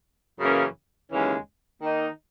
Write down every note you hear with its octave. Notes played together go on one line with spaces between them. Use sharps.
F#2 C#3 E3 A#3 C#4
D#2 C#3 E3 G#3 C#4
D#3 A#3 D#4